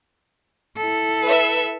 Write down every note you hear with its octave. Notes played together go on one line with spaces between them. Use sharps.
E4 A4
B4 E5